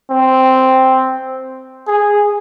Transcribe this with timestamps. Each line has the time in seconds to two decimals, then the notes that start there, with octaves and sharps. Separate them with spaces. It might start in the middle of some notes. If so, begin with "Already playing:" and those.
0.10 C4
1.87 G#4